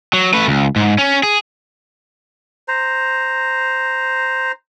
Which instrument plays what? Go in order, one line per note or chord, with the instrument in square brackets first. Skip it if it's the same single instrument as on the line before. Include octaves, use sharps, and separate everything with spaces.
[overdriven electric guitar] F#3
A3 B4
C#2
G#2
C#4
G#4
[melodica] C5 A#5